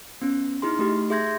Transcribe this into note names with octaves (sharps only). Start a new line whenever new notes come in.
B3 C#4
D#4 E4 G#4 C6
A3 D#4 G4
G#4 E5 C6 G6 G#6 A#6